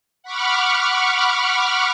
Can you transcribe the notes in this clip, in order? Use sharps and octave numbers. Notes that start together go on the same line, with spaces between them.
F#5 B5 C#6 D6 F6